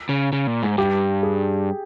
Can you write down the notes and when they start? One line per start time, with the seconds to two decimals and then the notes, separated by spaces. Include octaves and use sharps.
0.09 C#3
0.33 C#3
0.47 A#2
0.63 G#2
0.78 G2 G4
1.23 G#4